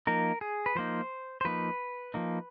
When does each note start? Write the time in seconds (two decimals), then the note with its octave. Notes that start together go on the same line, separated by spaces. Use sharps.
0.07 F3 A#3 D#4 A#4
0.41 G#4
0.66 B4
0.75 F3 A#3 D#4 C5
1.41 C5
1.45 F3 A#3 D#4 B4
2.14 F3 A#3 D#4